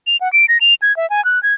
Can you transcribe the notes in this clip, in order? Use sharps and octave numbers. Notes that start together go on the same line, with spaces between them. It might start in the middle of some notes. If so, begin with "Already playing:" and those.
F7
F#5
D7
A#6
F7
G#6
E5
G#5
F#6
G#6